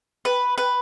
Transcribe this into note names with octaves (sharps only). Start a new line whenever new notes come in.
B4
B4